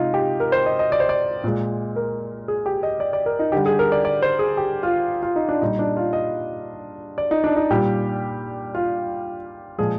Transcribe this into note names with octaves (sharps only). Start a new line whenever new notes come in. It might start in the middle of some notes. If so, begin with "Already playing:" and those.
Already playing: C3 G#3 D#4 F4
G4
A#4
C5
D#5
D#5
D5
C5
D5
A#2 G#3
A#4
G#4
G4
D#5
D5
D5
A#4
D#4
D3 G3 G4
G#4
A#4
D5
D5
C5
G#4
G4
F4
F4
D#4
D4
A#2 G3 D#4
D4
F4
D#5
D5
D#4
D4
D#4
A#2 G3 G4
F4
A#2 F3 G#3 G#4